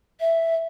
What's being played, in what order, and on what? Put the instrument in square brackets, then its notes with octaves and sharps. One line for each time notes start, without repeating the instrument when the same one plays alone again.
[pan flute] E5